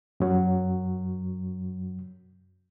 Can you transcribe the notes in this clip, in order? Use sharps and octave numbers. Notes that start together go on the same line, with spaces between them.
F#2 F#3